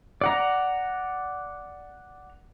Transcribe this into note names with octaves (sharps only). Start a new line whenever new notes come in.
D5 F#5 A#5